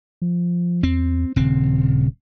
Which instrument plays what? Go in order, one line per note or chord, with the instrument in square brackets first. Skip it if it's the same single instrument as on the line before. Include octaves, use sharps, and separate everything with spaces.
[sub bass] F3
[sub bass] E2 [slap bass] C4
[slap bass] D#1 C4 [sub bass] C#3